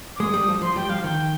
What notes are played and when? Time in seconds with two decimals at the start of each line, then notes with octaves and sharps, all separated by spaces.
0.16 D6
0.20 G#3 D#6
0.34 G3
0.48 F3
0.62 F3 C6
0.76 G3 G5
0.89 F3 F5
1.04 D#3 G5